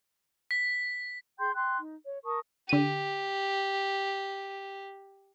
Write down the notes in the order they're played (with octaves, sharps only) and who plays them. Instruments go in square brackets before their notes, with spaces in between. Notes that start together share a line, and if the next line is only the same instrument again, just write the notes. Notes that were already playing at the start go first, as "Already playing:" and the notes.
[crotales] B6
[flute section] G#4 G5 C6 G6
G5 C6 F#6
D#4
C#5
A#4 A5 C#6 D#6
[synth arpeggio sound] D3 D#7 [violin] G4